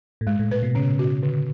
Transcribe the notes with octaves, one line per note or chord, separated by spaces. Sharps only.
A2
G#2 G#3
A2
A#2 B4
B2
C#3 C#4
F#4
D3